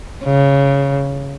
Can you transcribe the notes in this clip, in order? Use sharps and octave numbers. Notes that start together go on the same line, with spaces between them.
C#3